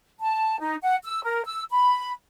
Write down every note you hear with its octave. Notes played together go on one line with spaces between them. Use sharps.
A5
D#4
F#5
E6
A#4
E6
B5